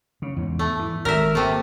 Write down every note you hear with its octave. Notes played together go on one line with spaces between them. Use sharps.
C#3
E2 G#2
A3
E3
G#1 A#4 E5
C3 A3 A#3